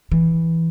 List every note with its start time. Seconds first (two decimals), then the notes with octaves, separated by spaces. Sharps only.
0.12 E3